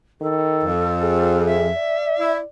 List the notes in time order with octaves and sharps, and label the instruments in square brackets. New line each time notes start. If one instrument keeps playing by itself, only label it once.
[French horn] D#3 [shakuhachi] A4
[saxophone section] F2
[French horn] G#4
[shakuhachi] E5
[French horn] D5
[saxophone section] E4